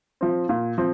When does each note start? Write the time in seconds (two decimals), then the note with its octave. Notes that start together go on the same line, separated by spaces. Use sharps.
0.21 F3 C4
0.49 A#2
0.78 F3 C4